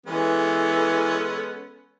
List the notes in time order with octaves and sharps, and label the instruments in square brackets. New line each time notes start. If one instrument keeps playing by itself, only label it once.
[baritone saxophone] E3 [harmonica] G#3 B3 C#4 [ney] A4